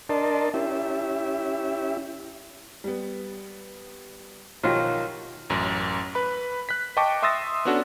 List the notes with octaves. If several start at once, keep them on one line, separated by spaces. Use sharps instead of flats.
D4 A#4 D5 D#5 A5 C6
C#4 E4 G4 E5
G3 B3
B1 D#3 F3 F#3 F4 G4
A1 F#2
B4 B5
F#6 B6
D#5 G5 A5 C#6 D6
E5 C6 D#6 E6 A6 A#6
B3 C#4 D4 F#4 A4